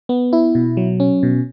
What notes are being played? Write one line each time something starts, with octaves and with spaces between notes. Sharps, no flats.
B3
E4
B2
F#3
C#4
B2